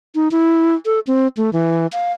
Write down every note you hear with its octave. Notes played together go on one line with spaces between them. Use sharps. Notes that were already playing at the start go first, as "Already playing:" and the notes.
D#4
E4
A4
C4
A3
E3
F5